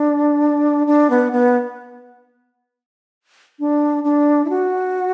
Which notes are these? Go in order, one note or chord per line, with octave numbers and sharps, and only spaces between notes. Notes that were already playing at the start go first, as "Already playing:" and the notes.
Already playing: D4
D4
B3
B3
D4
D4
E4
F#4